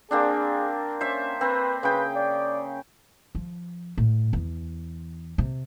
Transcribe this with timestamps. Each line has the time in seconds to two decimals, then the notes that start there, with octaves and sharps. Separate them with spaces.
0.11 A#3 C4 D4 G#4
1.01 C#4 C5 E5
1.41 C4 B4
1.83 C#3 B4 G5
2.15 D5
3.35 F3
3.98 A2
4.33 E2
5.38 C3